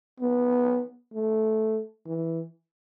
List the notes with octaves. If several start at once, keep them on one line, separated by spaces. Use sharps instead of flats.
B3
A3
E3